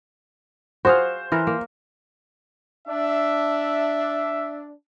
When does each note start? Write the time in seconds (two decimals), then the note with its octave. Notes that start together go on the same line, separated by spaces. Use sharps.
0.85 F#4 G#4 C5 F5
1.32 E3 A#4 B4
1.47 A#3
2.88 D4 E5